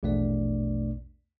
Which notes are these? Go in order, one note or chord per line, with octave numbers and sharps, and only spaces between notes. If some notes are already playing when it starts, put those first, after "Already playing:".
A#1 E2 B2 A3 D4 D5